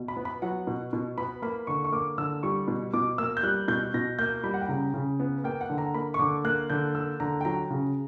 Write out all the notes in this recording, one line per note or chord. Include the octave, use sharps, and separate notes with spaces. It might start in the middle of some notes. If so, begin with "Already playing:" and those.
Already playing: B2
B5
B3
B5
F#3 F#5
B2
B2
B3 B5
A#3 B5
D3 C#6
C#6
A#3 D6
D3 E6
G3 C#6
B2
B2 D6
A#3 E6
G6
G3 F#6
B2 G6
B2 A#6
A#3 G6
G3 B5
F#5
G5
C#3 A#5
C#3
B3
A#3 G5
F#5
D3
A#5
A#3 B5
C#6
D3 D6
A#3 F#6
D3 G6
A#3 E6
D3 A#5
G5
F#3 A#5
C#3